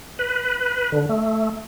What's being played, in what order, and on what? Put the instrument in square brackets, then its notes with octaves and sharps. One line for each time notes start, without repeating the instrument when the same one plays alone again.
[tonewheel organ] B4
D3
A3